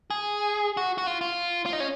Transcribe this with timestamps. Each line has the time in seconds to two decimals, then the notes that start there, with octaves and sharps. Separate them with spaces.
0.10 G#4
0.77 F#4
0.98 F#4
1.07 F4
1.21 F4
1.66 F4
1.73 D#4
1.80 C#4